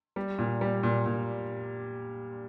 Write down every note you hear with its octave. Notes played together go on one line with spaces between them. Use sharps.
G3
A#2
G3
A#2
A#2